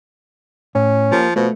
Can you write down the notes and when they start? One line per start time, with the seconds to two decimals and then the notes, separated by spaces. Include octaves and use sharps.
0.75 A2 C#4
1.12 F3 A#3 G4 A#4
1.36 B2 F3 A3